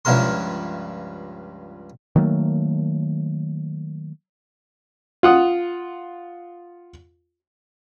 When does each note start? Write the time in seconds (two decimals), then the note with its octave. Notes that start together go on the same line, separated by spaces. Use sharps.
0.05 C#2 G2 F3 E4 A#4 C6
2.16 D#3 F#3 A3 A#3
5.23 F4 F#5 D#6